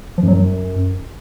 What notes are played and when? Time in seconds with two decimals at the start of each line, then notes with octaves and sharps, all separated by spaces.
0.18 F3
0.23 F#2
0.28 F#3
0.33 F#2